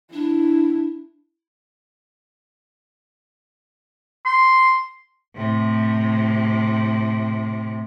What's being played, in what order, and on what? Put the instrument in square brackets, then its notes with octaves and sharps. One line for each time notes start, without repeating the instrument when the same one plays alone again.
[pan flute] D4 [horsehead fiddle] E4
[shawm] C6
[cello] A2 C3